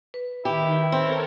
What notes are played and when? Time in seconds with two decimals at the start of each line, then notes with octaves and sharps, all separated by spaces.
0.14 B4
0.45 D#3 E4 G4
0.92 C4 A4 A#4 C#5